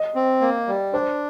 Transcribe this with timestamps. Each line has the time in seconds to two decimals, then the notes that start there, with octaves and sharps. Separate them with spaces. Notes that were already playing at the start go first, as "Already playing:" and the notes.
Already playing: D#5
0.15 C4
0.41 A#3
0.67 G3
0.93 D4 C5